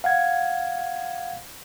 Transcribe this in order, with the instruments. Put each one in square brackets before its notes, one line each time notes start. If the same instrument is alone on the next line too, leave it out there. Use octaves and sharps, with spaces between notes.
[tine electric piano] F5 F#5 G#6